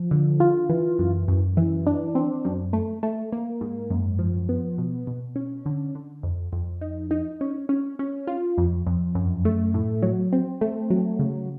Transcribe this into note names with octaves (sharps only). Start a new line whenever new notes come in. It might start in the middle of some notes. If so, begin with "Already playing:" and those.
Already playing: F3
D3
F4
E3
F#2
F#2
E3
D4
C4
F#2
A3
A3
A#3
G#2
F#2
F3
B3
B2
B2
C#4
D3
D3
F2
F2
D#4
D#4
C#4
C#4
C#4
F4
F2
F2
F#2
A3
A2
F#3
C4
A3
F#3
C#3